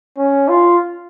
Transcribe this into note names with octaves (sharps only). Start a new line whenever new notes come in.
C#4
F4